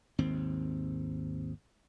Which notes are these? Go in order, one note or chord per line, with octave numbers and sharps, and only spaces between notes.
G#1 D#2 C4